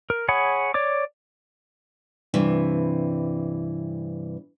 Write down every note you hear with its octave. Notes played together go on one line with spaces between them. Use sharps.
A#4
G#4 C#5 F#5 B5
C#5 D5 D6
G2 C3 E3